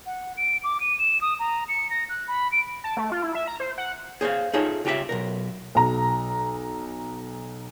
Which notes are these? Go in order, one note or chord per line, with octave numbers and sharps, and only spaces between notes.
F#5
D7
D6
D#7
E7
D#6
A#5
C#7
A#6
F#6
B5
D7
A5
A3
F4
E4
E5
A#5
C5
F#5
G#4 C5 C#5 F5
D#4 F4 G#4 A4 C#5 E5
C#2 F4 G4 G#4 E5
B1 B2 A#4
B1 A#5